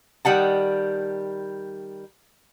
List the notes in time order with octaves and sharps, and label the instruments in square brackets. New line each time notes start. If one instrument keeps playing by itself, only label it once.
[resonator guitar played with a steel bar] D#3 G3 F#5 A5